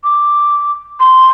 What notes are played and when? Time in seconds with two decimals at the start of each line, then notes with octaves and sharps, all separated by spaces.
0.04 D6
1.00 C6